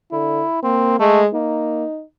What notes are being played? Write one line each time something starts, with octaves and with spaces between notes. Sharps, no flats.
D3 E4
A#3 C4
G#3 A3
A#3 D#4